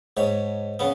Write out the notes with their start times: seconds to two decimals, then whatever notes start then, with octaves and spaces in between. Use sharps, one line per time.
0.17 G#2 C#5
0.79 C#3 B3